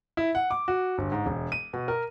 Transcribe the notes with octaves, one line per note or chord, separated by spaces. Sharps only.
E4
F#5
D6
F#4
G1
G#2
E1
D#7
B2
A#4